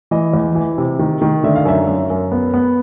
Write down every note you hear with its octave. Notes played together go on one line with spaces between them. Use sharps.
E3 D#5
E2
E3
C3
D#3
D#3
D3 E5
F5
F#2 E5
F#2
F#2
B3
B3